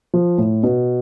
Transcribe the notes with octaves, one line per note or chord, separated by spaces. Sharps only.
F3
A2
B2